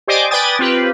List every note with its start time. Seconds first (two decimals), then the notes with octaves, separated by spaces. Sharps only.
0.08 G4 C5 D5 D#5 G#5 D6
0.30 B4 D5 G5 G#5 D#6 A6
0.59 C4 F4 G4 B4